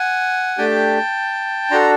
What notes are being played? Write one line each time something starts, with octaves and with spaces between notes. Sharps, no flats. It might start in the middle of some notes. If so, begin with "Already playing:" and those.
Already playing: F#5 G#5
A3 D4 G4 G5 A5
D4 F#4 A4 A#5 C6